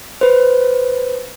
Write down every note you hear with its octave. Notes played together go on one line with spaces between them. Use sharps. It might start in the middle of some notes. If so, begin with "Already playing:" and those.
B4 C5